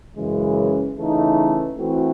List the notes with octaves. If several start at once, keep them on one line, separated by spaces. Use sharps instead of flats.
F#2 C#3 E3 G#3
C#3 E3 A3 D#4
E3 A3 C4 F#4